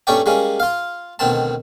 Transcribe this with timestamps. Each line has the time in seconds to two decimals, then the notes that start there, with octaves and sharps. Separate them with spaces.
0.07 G2 A3 C#4 C#5 D5 G5
0.26 G3 G#3 A#3 C#4
0.60 F4 F5
1.19 D2 B2 D#3 C4 A5